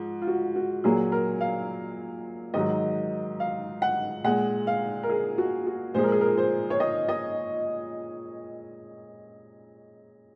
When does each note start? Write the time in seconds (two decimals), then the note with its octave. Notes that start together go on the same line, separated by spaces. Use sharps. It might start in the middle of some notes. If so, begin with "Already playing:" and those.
Already playing: G#2 F3
0.22 F4
0.27 F#4
0.56 F#4
0.84 A#2 F#3 A#3 G#4
1.12 A#4
1.41 F5
2.54 G#2 D#3 F#3 D#5
3.40 F5
3.82 F#5
4.24 A#2 G#3 F#5
4.67 F5
5.03 A#4
5.10 G#4
5.38 F#4
5.67 F#4
5.95 A#2 F3 G#3 C5
6.04 A#4
6.12 G#4
6.21 A#4
6.38 C5
6.70 C#5
6.80 D#5
7.09 D#5